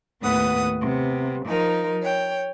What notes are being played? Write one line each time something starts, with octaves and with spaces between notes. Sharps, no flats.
D#2 A2 B3 B4 F#5 D#6
C3 B3
F3 D#4 A#4
C#5 G5